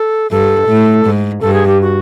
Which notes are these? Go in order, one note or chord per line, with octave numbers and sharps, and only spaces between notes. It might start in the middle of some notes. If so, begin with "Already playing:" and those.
Already playing: A4
G2 A4
A2
G#2
G2 A4
G#4
G4
F#4